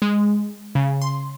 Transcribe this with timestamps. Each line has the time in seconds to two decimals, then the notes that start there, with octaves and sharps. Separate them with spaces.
0.02 G#3
0.75 C#3
1.02 C6